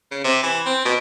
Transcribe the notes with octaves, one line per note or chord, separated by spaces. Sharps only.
C#3
C3
E3
C4
B2